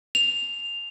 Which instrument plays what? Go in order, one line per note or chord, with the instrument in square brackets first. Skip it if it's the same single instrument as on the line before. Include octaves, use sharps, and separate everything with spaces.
[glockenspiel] F7